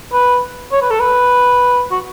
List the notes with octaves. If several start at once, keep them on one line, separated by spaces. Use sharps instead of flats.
B4
C#5
B4
A4
B4
F#4